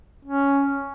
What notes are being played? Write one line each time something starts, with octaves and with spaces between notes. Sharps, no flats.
C#4